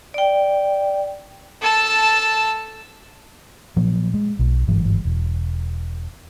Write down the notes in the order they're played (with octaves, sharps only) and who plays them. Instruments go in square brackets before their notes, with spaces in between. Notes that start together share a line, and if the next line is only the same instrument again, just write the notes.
[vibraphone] D5 G5
[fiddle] A4 A5
[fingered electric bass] A#2 F3 F#3 A#3
G#3
B1
G1 G#2 E3 F#3
E1